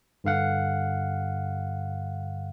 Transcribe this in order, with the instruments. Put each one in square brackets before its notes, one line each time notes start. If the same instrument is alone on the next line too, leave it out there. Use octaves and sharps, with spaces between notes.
[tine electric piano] G2 D3 F5 F#5